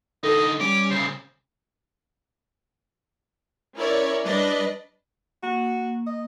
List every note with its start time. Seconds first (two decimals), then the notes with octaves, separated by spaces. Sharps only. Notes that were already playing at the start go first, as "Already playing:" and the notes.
0.24 D3 D#4 A4 D#5
0.60 G3 C#4 D6
0.90 C2 C#3 C5
3.76 C#4 E4 A#4 C#5 D5
4.24 G3 D4 B4 D5 D#5
5.43 A#3 F#4
6.07 D#5